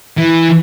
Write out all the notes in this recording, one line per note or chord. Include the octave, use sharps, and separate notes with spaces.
E3